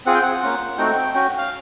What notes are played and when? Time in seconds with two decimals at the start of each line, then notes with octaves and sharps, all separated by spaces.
0.06 C4 F4 G#4 F#5
0.14 G5
0.23 F#5
0.42 A#3 C#4 F4
0.78 A3 C4 D#4 F#4 G5
1.14 C#4 F#4 G5
1.38 F5